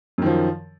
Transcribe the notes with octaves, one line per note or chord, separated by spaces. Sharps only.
F#2 D#3 F3